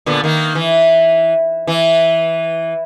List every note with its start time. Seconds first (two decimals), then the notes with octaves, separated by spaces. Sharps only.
0.06 A#2 D3 B3
0.24 D#3 A#3
0.55 E3
1.67 E3